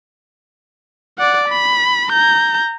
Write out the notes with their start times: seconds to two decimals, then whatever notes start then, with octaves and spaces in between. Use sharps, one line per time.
1.18 D5 F#5
1.48 B5
2.10 A#5 G6